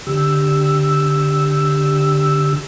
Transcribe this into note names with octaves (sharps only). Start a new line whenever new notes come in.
D3 G4 E6